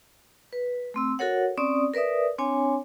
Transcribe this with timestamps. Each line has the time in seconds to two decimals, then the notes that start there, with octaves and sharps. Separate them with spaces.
0.53 B4
0.94 A3 C4 E6
1.19 F#4 A4 A#4 C#5 F#5
1.58 C4 C#4 D5 D#6
1.94 A#4 B4 D5 E5 D#6
2.38 C4 D4 C#5 G#5